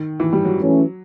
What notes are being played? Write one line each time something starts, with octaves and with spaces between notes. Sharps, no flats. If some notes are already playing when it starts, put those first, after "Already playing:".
Already playing: D#3
E3
G3
F#3
E3 A3 C#4